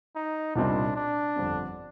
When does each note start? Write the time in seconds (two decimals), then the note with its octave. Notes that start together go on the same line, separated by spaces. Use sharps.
0.16 D#4
0.56 C2 A#2 G3 C4 D4 D#4
0.96 D4
1.36 G1 F2 D3 G3 C4